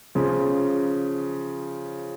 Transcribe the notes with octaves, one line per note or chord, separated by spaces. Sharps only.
C#3 F3